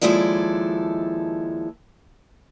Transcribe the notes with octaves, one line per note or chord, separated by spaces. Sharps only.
D#2 F3 G#3 E4 A4 D5